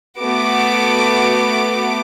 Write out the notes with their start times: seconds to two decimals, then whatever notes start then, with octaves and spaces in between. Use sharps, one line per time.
0.20 A3 B3 F#4 D6 D7